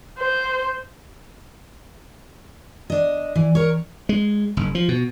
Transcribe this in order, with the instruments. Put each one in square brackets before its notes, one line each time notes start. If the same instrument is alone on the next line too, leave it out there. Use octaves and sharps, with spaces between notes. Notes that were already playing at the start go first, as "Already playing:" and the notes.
[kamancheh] C5
[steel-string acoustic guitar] D4 D#5
E3
A#4 C#5
[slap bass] G#3
F#1
F3
B2